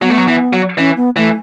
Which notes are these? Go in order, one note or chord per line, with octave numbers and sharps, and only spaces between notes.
F#3 B3
A3
F#3
E3
F#3
E3 C#4
B3
E3 A3